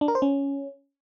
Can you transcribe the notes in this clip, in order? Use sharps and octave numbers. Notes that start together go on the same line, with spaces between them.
D4
A#4
C5
C#4